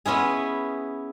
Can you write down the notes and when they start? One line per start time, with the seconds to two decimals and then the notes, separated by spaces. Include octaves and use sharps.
0.06 B3 C#4 E4 G#4